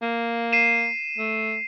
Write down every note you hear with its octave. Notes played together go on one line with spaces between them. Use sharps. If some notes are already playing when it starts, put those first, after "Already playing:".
A#3
C7 D#7 E7
A3